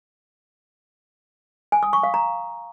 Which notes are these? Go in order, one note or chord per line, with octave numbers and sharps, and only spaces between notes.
G#5
D#6
C#6
F5
A#5